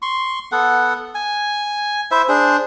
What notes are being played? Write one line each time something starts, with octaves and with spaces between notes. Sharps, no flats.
C6 C#6
B3 A4 F#5
G#5
E4 C5 E5
D4 G#4 C5